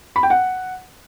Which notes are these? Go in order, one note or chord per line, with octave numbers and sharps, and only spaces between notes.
B5
G5
F#5